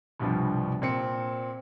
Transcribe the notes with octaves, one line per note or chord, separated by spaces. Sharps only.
C2 G2 B2 F3 G3
A#2 C4 C#7